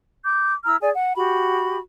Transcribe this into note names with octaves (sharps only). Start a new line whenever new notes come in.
D6 G6
E4 A#5 E6 F6
G#4 D5 G#5
F#5
F#4 G4 B5